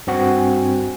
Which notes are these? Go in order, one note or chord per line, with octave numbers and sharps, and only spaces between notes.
G2 C4 F#4 F#5 G#5